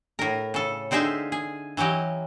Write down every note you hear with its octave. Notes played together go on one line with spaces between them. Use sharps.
A2 A#4
C#3 A4
D3 C4 D#4 G#4 E5 F5
G#4
E3 F#3 C#4 G4 D#5